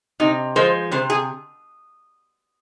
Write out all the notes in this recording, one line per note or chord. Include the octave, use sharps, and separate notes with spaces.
C3 D#4
F3 G#3 C5
C3 C5
G#4